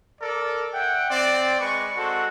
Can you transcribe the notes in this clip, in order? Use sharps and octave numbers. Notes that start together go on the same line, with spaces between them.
A4 A#4 D5
E5 F#5 G5
C4 D5
G#3 B4 C#6
G#3 C4 F#4 A4